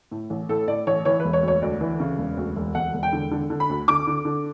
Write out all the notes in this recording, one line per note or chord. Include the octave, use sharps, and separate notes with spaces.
A2
A1
A2 A4
A2 D5
A1 C#5
E3 C#5
B4
E1
C#5
D2
C#5
D2 D5
E3
C#3
E1
D2
E1
E1 F#5
E1
G5
D3
D3
D3
B5
D2
D3 D6
D3
D3